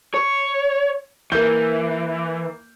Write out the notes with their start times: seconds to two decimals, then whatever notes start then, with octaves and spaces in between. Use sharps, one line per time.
0.14 C#5
1.32 E3 A#3 G6